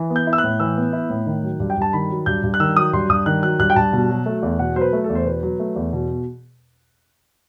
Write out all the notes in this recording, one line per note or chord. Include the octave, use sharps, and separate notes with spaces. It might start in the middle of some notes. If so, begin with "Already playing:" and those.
Already playing: E3
B3
G6
E4
E6
F#6
A2
E3 E6
B3
E4
A2
D#3
F#3
G2
G5
G2 A5
D#3 B5
F#3
G2 G6
G2
F#6
D#3 E6
F#3 D#6
G2 C6
G2 D#6
D#3 F#6
F#3 F#6
G2 F#6
G5
G2 A5
B2
F#3
A3
E2
B2 F#5
F#3 C5
B4
A3
A4
E2
C5
B2 B4
F#3
A3
E2
B2